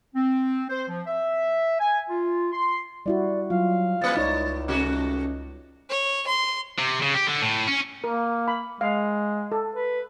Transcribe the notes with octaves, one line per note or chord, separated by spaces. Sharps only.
C4
C5
F3
E5
G#5
F4
C6
G3 E4 F#4 D5
F#3 F4 F5
E2 A#3 B4 A6
C#2 D#4 E4 C#5 D5
C3 A3 C#4 F#4
C#5
C6
C3
C#3
G4
D3
A2
C#4
A#3 A#4
B5
G#3 F5
A4
B4